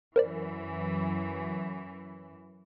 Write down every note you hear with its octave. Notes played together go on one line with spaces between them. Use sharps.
F#2 E3 A#4 C5 D5